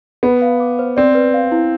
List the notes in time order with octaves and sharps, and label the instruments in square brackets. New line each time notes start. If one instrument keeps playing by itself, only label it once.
[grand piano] B3 [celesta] B5
[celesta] F5
D6
C5
[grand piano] C4 [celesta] D5
[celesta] B4
F5
E4